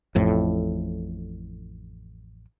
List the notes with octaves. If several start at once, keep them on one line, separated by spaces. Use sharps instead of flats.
A1 F2 A2